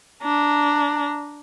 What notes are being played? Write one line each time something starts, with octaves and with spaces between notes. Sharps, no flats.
D4 A#5